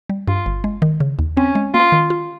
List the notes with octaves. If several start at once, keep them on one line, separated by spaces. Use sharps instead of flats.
G3
G2 F4
G1
G#3
D#3
C#3
D#2
C4 C#4
G#3
A#3 F4
D#3
F4